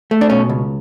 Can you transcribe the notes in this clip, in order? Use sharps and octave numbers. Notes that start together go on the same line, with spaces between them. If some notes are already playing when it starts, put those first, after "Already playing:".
A3
D4
B2 C#4
C#2